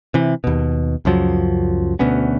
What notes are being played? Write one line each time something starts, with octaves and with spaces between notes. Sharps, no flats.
C3 E3
D#2 B2
C#2 F#2 F3 F#3
D2 B2 B3 C#4